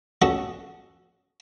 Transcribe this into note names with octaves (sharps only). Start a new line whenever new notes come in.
C#4 F#4 A4 D#5